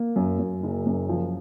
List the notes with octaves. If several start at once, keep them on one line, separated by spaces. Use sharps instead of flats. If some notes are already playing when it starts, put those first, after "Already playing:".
Already playing: A#3
F#2
F#2
F#1
F#2
F3